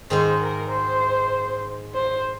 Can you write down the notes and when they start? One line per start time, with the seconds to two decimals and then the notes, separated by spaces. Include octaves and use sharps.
0.10 G#2 D#3 G#3 D#4 C5
0.41 A#4
0.71 C5
1.94 C5